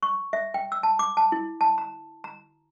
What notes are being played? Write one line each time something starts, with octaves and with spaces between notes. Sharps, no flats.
C#6
E5
G5
E6
A5
D6
A5
E4
A5
A#5
A#5